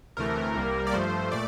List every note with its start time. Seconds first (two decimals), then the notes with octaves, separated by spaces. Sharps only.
0.17 D2 C3 E3 A3 A#4
0.55 C2 C3 G3 A#3
0.87 D5
0.93 G2 F3 A3 C5
1.32 A#2 A3 D5